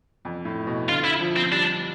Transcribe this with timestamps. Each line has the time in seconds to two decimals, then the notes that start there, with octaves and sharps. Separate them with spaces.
0.25 F2
0.45 A2
0.67 B2
0.88 D3 F4
1.04 E4
1.20 F3
1.36 C4
1.52 G3 D4